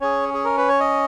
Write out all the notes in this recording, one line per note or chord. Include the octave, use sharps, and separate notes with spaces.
C#4 G#4 C#5
G#4
A#4
B4
C#5
D#5